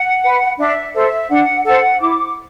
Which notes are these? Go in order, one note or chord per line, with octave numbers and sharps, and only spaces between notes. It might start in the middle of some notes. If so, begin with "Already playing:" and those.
Already playing: F#5
B4
D4 E5
A4 C5 E5
D4 F#5
A4 C5 F#5
E4 D6